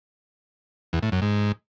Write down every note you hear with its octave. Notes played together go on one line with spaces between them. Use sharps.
E2
A2
F#2
G#2